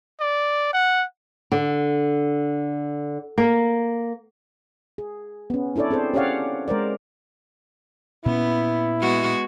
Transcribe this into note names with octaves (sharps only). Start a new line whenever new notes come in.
D5
F#5
D3
A#3
G#4
B3 C#4
D4 E4 A4 C#5 D5
C4 G#4 A4 C5
C#4 G4 C#5 D5 F5 F#5
G#3 A#4 C5 D5
A#2 B3 C#4 E4
G#3 B3 F#4